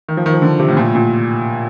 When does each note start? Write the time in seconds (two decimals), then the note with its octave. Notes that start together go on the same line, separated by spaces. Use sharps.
0.09 D#3
0.17 F3
0.26 D#3
0.34 F3
0.42 D3
0.60 C3
0.68 A2
0.77 A#2
0.85 A2
0.95 A#2